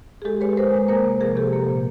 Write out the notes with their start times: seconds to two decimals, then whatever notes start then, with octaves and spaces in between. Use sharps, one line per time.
0.22 G#4
0.25 G#3 G4 A4
0.41 G#3 B4 C#5
0.57 G#3 A#4 C5
0.73 G#3
0.88 A#3 A#4 C5
1.05 C3
1.20 F3 G#4 A#4
1.36 C3 G4 A4
1.53 A#3
1.68 A#2